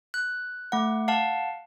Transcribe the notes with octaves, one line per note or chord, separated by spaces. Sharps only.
F#6
A3 F#5
F5 F#5 A5